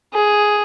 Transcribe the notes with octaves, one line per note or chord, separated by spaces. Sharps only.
G#4